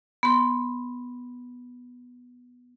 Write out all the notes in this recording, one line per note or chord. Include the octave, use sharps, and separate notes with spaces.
B3 C6